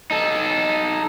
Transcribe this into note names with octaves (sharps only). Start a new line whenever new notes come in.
D#4 A4